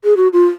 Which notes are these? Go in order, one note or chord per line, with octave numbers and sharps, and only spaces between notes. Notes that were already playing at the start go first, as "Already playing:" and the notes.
G#4
F#4
F4